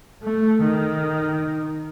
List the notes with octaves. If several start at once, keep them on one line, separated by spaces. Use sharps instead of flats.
A3
D#3